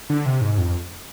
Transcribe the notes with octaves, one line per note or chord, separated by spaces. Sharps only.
D3
C3
G#2
F2